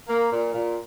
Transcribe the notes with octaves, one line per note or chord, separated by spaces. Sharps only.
A#3
A#2
A#2